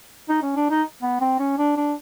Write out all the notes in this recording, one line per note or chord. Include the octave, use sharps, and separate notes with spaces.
D#4
C#4
D4
D#4
B3
C4
C#4
D4
D4